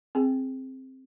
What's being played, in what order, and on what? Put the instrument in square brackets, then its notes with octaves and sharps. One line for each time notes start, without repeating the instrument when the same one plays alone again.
[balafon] C4 G#4 G5